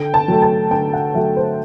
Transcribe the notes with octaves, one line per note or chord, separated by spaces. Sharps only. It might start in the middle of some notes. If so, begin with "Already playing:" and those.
Already playing: D3 G5
A5
F#3 A3
A5
D3 G5
F#5
F#3 A3 E5
C5